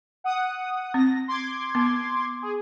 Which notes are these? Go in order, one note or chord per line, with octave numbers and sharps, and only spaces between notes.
F#5 D#6
C4 A#6
C6 D6 G#6
B3
G#4